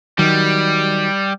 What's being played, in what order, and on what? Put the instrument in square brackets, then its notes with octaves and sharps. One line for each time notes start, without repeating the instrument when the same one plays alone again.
[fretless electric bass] D#3 F#3 [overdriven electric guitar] G3